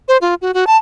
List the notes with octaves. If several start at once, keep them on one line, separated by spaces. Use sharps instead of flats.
C5
F4
F#4
F#4
A5